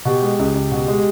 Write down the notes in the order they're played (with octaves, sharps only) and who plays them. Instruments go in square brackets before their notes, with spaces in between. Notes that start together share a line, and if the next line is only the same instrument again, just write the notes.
[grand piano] B2 [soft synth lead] G4
[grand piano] G#3
C#2
C#2
B2
G#3